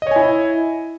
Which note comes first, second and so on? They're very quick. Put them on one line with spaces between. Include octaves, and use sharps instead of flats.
D#5 C#5 G#5 E4